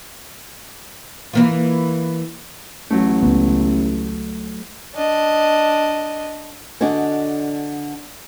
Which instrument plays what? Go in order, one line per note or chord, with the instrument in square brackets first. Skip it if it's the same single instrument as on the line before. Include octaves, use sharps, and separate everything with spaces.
[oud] E3 A#3 F4
[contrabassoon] A1 [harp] F#3 A3
[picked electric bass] C#2 B3
[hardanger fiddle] D4 D#5
[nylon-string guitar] D3 D4 F#4 D#5 G#5